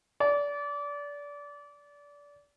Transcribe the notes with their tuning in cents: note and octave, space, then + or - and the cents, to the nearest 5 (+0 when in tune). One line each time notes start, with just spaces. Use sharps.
D5 -25